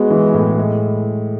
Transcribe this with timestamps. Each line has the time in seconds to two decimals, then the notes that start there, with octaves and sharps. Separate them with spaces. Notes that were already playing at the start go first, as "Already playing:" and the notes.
Already playing: G#3 B3 F#4
0.10 E3
0.34 A2
0.58 G#3